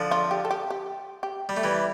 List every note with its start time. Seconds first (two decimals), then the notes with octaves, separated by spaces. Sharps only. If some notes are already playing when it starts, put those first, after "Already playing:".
Already playing: D3 F3
0.11 F4
0.31 G4
0.45 A4
0.51 G4
0.70 G4
1.23 G4
1.49 G3
1.57 A3
1.64 E3 G3